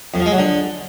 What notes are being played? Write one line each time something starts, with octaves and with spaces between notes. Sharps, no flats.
F2
F3
G#3
F#3
D3